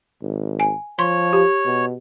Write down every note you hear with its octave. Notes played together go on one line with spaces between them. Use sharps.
G#1
G#5
F3 C#5 C6
G4
B2